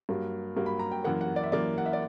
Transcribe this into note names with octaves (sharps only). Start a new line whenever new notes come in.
G2 F#3 A#3
G2 F#3 A#3
B5
A#5
G5
F#2 E3 A#3 F#5
F#5
D5
E5
F#2 E3 A#3 D5
F#5
E5
D5